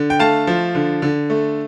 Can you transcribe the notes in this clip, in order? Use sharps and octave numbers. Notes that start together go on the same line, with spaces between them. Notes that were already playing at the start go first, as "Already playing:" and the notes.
Already playing: D3
G5
A3 F5 A5
F3
D3
D3
A3